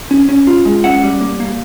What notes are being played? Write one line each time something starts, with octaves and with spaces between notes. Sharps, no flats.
C#4
C#4
F4
G#3
C#4 E5 F#5
G3
A#3
A#3